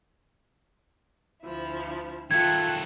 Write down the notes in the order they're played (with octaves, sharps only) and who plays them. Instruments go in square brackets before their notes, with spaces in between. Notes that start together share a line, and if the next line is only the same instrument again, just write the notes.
[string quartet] D2 F3 E4
[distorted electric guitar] D#3 A3 [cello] F4 A4 [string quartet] G5 F#6 [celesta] G#6